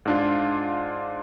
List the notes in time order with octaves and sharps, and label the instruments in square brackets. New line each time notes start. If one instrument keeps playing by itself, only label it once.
[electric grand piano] G#2 D4 F4